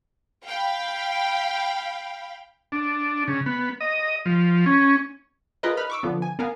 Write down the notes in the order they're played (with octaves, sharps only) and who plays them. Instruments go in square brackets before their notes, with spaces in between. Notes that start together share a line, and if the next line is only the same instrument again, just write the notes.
[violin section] F5 G5 B5
[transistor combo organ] D4
C#3
B3
D#5
F3
C#4
[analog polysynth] F4 G#4 A#4 B4 D#5
D#4 B4 B5 F6
C#6 D6 E6
D3 F3 B3
G#5
B3 A#4 F5 G#5